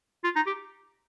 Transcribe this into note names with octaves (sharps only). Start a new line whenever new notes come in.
F4
D#4
G4